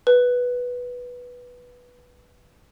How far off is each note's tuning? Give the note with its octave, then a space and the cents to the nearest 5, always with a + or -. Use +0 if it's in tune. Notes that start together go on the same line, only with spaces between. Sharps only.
B4 -5